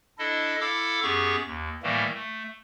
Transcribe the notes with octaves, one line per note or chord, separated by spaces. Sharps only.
D4 E4 A4 D#5
E4 A4 F5 D6 E6
F#2 B3 G4 G#4 C#6
D#2
A2 D#3 E3 G3 A3 A#3
A3